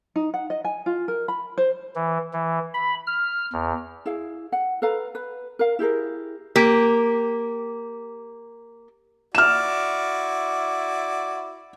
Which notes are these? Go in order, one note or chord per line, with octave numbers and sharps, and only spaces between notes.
D#4
F#5
D#5
G#5
F4
A#4
B5
C5
E3
E3
B5
F6
E2
E4 G#4 F5
F#5
A4 B4 F5 A#5
B4
A#4 F5
E4 G4 G#4 A#4
A#3 G4
E4 F#4 D5 F6 E7